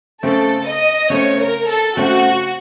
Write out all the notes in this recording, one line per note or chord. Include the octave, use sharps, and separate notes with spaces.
C#3 A3 C4 A4
D#5
C#3 A3 C4 C#5
A#4
A4
C#3 A3 C4 F#4